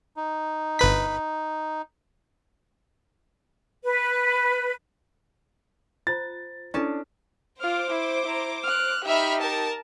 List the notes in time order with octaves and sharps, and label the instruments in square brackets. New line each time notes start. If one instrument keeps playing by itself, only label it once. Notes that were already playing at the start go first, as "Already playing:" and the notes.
[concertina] D#4
[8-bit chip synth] G1 B4 B6
[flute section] B4
[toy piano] F4 C5 A#5 [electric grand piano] A6
[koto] C#4 A5 [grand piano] D4 [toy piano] E4 A4 D#5
[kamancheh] F4 F6 [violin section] C5 D6
[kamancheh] E4
E4 A#5
F6 F#6
[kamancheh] D#4 G4 [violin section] E5 B5 F6
[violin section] A#4 A5